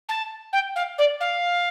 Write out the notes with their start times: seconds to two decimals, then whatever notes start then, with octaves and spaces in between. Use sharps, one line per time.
0.09 A5
0.53 G5
0.76 F5
0.98 D5
1.20 F5